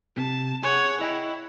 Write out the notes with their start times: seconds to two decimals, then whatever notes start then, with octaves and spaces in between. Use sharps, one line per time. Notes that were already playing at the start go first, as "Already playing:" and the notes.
0.18 C3 A5
0.63 G#4 C#5 F#5
1.01 E4 D#5 G5